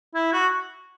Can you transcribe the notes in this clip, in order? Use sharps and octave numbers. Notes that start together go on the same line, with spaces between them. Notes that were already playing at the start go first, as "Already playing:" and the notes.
E4
F#4